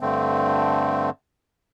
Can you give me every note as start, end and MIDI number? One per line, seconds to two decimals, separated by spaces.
0.01 1.10 43
0.01 1.10 50
0.01 1.10 57
0.01 1.10 60